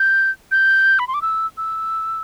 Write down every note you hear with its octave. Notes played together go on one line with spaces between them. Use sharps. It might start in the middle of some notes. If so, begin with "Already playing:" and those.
Already playing: G6
G6
B5
C6
D6
E6
E6